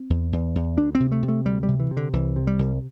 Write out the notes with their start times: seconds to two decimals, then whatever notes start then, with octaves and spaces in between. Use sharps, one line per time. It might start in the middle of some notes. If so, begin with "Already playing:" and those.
Already playing: C4
0.10 E2
0.32 E2
0.55 E2
0.77 D2 D4
0.95 C4
1.00 C3
1.12 A3
1.23 C3
1.28 A3
1.45 D2 G3
1.63 G3
1.68 C3
1.80 E3
1.91 C3
1.97 D3
2.13 C2 E3
2.36 C3
2.47 G3
2.59 C2